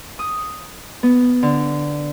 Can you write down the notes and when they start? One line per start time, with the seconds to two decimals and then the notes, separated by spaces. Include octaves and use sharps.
0.19 D#6
1.03 B3
1.43 D3